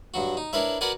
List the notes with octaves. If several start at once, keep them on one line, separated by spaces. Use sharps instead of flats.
G2 F#3 F#4
D#4
D4 E4 A#4 B4 C#5 E5
F#4 A#4 B4 D5 F#5 G#5